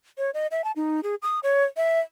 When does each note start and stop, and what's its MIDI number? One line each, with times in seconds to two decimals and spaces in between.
0.18 0.31 73
0.34 0.47 75
0.51 0.64 76
0.64 0.72 81
0.76 1.01 63
1.03 1.15 68
1.22 1.39 87
1.43 1.65 73
1.77 2.01 76